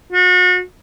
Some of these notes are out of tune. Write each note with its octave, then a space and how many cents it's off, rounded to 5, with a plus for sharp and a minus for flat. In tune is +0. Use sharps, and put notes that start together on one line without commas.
F#4 -35